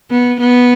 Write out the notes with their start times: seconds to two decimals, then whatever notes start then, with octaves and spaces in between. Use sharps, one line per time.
0.11 B3
0.40 B3